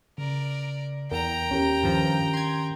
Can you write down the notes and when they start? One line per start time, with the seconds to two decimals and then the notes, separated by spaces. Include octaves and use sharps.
0.18 C#3 A#4 D5
1.11 E2 A#4 G5 A#5
1.51 D#2 C#4 G4 A#4
1.83 G2 D#3 F3
2.33 C6 G#6